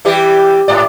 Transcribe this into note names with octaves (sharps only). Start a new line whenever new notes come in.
E3 G3 G4
G#2 D5